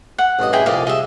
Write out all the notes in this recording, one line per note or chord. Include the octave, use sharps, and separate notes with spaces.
F#5
A1 G2 D#5
E4 G#4 G5
C2 F2 A#2 D5 D#5 F5
G3 G#3 D#5 E5